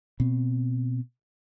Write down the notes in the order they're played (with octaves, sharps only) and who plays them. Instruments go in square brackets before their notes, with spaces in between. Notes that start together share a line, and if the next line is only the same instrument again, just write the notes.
[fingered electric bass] B2 C4